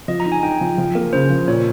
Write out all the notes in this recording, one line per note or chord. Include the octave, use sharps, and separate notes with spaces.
F3 D#5
A#5
D#4
G#5
D#4 G5
F3
F3
A#3
C#3 C5
F3
A#2 C#5